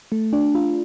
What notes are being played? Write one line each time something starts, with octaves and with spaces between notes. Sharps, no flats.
A3
D4
F4